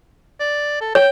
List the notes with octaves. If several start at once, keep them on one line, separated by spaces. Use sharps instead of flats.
D5
A4
C#5 G5